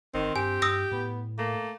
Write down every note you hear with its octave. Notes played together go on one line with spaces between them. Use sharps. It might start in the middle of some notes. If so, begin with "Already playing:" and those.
G1 D#3 C4
G2 G4 G#5
G2 D#6 E6 A#6
A2 B3
A3 A#3